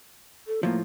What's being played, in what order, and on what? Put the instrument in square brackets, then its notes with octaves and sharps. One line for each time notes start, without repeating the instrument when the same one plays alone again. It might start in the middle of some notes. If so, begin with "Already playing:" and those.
[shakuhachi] A4
[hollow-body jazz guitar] A2 F3 [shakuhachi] A#3